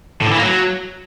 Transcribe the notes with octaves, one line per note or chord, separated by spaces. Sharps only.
A2
D3
E3
A#3
F#3